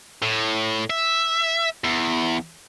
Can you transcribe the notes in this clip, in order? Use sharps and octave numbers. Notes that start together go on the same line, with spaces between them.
A2
E5
E2